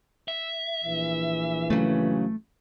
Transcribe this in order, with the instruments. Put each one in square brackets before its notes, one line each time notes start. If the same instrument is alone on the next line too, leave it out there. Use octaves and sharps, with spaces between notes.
[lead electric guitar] E5
[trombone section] A#1 E3
[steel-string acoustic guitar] C#3 F#3 [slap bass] A3